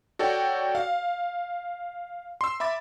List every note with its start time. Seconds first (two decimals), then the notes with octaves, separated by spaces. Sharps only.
0.19 F#4 A4 C#5 D5 G5
0.75 F5
2.41 C6 E6
2.60 E5 B5 D6 A6